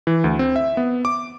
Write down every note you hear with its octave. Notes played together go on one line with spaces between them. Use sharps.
E3
D2
C4
E5
B3
D6